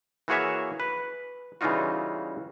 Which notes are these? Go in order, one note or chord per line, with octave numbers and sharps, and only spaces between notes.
E3 A#3 F#4 G#4 C#5 E5
B4
C#3 E3 G3 D#4 F4 F#4